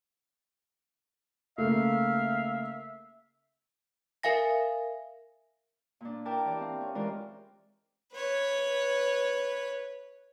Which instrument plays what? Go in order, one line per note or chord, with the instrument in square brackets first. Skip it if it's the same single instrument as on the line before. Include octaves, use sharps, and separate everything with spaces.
[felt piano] C#3 A3 A#3 [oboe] E5 [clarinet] F5
[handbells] A#4 E5 F5 G#5 A#6
[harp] A#2 D4
E4 A#4 G5 A5 D6 G6
E3 G4 D5
C4 F5
C#4
E3 G#3 F4 A#4 C5 D5
[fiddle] B4 C#5